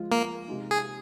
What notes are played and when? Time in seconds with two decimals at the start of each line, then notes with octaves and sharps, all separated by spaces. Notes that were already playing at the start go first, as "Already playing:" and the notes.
Already playing: F3 G#3 F4
0.12 A#3
0.48 C3 G#3 D#4
0.71 G#4